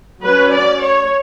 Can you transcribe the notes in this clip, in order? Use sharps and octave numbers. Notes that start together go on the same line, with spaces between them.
F#3 C#4 B4
D5
C#5